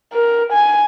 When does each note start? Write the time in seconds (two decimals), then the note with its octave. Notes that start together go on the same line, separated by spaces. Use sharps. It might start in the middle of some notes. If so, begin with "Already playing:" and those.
0.13 A#4
0.52 G#5